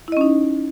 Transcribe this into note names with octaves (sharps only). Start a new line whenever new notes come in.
C#4 D#4 E4 D#5